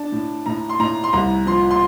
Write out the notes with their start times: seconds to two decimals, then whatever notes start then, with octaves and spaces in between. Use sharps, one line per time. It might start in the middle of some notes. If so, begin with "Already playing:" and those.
Already playing: D4 A5
0.12 A2
0.46 A2 A#5
0.69 C6
0.80 A2 A#5
1.04 C6
1.13 C2 A#5
1.46 F3 C6
1.71 C6